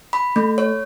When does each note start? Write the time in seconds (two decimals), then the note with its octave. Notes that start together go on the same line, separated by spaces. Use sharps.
0.13 B5
0.36 A3
0.58 C#5